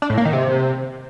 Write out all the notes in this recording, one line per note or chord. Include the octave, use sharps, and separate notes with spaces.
D4
A2
A#3
D#3
C3